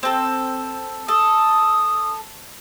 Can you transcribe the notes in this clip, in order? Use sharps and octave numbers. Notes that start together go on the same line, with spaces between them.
C4 A4
A4 D#6